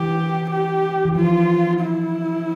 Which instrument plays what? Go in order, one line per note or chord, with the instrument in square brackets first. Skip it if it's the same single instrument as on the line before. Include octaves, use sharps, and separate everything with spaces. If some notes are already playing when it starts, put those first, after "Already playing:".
Already playing: [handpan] E3 [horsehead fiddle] G4
[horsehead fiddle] G4
[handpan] E3
[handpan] F3 [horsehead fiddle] F4
[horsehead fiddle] E4